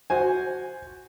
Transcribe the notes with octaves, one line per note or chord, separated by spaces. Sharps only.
F#4 C5 G#5